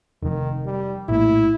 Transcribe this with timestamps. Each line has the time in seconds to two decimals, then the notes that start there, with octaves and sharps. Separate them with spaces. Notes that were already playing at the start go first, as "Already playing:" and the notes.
0.22 F1 F2 D#3
0.66 G3
1.09 A#1 A2 A#3 E4